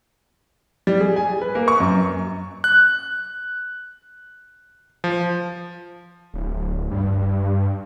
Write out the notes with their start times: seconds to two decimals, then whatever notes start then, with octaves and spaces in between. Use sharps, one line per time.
0.87 G3
1.00 G#4
1.16 G#5
1.42 B4
1.55 A#3
1.68 C#6
1.80 F#2
2.64 F#6
5.04 F3
6.34 D1
6.91 G2